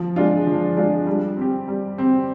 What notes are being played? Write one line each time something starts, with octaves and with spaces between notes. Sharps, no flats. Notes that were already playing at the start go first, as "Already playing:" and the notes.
Already playing: F3
G#3 D4 F4
F3
G#3 D4 F4
G3
C4 G4
G3
C4 G4